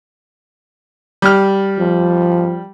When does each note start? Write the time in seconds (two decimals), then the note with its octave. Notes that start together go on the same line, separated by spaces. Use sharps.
1.22 G3 F6
1.79 F3